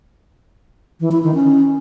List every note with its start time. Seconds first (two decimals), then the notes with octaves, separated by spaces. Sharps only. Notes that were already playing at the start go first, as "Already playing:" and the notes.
1.00 E3
1.12 E4
1.23 D#3
1.34 C#4